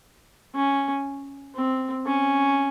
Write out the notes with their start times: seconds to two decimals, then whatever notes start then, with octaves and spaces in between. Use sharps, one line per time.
0.55 C#4
1.56 C4
2.07 C#4